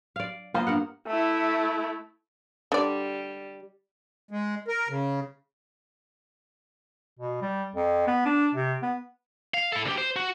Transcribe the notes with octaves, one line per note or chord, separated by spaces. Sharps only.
D5 F5
A#3 B3 F4 C5 D#5
G2 A#4 F#5
A3 E4
D3 G3 D5
G#3
A#4
C#3
B2
G3
F2
B3
D4
C3
B3
F5
E4 A4
D2 G4
C5
F#4